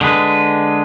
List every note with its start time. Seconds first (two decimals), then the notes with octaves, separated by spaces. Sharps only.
0.01 D3 G#3 B4